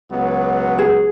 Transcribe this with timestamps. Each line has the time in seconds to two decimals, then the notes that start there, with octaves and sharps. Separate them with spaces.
0.11 C#2 F#3 B3
0.78 G#4